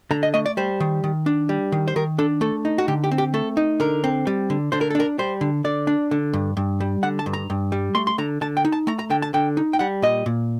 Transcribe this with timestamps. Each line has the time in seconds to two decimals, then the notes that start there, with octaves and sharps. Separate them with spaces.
0.11 D3 A#5
0.23 D#5
0.34 A3 D#5
0.46 D5
0.57 G3 C5
0.80 D#3
1.04 D#3
1.26 D4
1.49 G3
1.72 D#3
1.88 C5
1.96 D#3 A#4
2.18 D4 A4
2.41 A3 A4
2.65 D#4
2.78 F#4
2.88 D3 G4
3.04 G4
3.11 C4
3.18 G4
3.34 A3 A4
3.57 D#4
3.80 D3 A#4
4.04 C4
4.27 G3
4.50 D3
4.72 D3 C5
4.81 A#4
4.90 A4
4.95 D4 A#4
5.19 G3 C5
5.41 D3
5.64 D3 D5
5.87 D4
6.11 D3
6.33 G2
6.57 G2
6.80 G3
7.03 D3 F#5
7.19 A5
7.26 G2
7.33 A#5
7.50 G2
7.72 G3
7.95 A3 C6
8.07 C6
8.18 D3 A#5
8.41 D3 A5
8.57 G5
8.65 D#4
8.72 A5
8.87 A3 A#5
8.99 A#5
9.10 D3 G5
9.22 A5
9.34 D3 G5
9.57 D#4
9.73 G5
9.79 G3 F#5
10.02 A#2 D#5
10.26 A#2